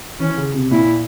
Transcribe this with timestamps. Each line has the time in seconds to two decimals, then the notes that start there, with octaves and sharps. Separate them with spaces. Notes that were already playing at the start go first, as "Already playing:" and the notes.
0.20 E3 C#4
0.37 C#3
0.54 C3
0.71 A#2 E4